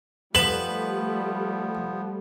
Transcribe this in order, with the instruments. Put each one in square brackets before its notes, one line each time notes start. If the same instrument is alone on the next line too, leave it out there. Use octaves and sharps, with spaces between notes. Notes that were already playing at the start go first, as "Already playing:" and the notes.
[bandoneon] F3 B3 [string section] G3 A3 [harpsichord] B4 [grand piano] E7 F#7